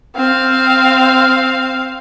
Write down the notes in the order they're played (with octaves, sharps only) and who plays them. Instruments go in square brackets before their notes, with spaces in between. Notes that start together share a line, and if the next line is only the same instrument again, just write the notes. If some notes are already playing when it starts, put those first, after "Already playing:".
[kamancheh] C4 F5